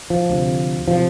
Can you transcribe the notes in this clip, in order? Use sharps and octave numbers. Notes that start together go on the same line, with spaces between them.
F3
D2 C3
C3 F3